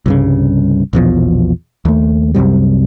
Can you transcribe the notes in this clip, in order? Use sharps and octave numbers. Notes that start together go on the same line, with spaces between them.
C2 G2 C#3
A#1 E2 B2 F3
D#2 A3
C2 F#2 C3 G3